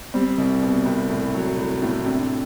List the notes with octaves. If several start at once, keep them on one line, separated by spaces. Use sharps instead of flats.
G3 C4
C2
B2
C2
A2
F#3
A2
A2
C3 D4